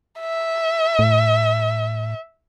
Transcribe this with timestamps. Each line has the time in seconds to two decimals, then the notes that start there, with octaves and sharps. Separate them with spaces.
0.20 E5
0.99 A2